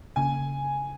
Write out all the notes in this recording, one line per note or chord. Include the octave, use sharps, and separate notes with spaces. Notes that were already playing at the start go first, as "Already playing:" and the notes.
C#3 A#3 C#4 G#5